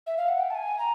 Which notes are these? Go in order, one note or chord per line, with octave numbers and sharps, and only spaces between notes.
E5
F5
F#5
G5
A5
G#5
A#5